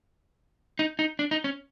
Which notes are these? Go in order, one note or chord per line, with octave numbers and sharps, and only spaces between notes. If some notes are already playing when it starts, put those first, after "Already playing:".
D#4
D#4
D4
D#4
C#4